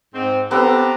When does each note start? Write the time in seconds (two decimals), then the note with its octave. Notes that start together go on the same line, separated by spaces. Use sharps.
0.14 G#2 C4
0.51 B3 C4 D4 G4 A4 A#5